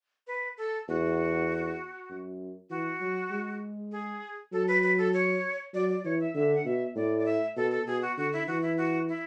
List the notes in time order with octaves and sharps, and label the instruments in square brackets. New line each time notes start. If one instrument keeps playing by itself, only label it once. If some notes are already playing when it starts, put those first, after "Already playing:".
[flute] B4
A4
[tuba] E2 [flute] F#4
[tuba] F#2
[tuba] E3 [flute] F#4
[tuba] F#3
G#3
[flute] G#4
[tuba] F#3 [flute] A4
[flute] B4
B4
A4
C#5
[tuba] F#3 [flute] D5
[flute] D5
[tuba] E3 [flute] C#5
[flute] E5
[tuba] D3 [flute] E5
[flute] F#5
[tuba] B2 [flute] E5
[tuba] A2 [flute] D5
[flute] D5
E5
[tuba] B2 [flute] A4
[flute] A4
[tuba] B2 [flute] G#4
[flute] F#4
[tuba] D3 [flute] F#4
[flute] E4
[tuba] E3 [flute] F#4
[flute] E4
F#4
E4